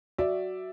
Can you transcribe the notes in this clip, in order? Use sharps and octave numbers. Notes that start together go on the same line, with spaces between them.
F#4 D5 E5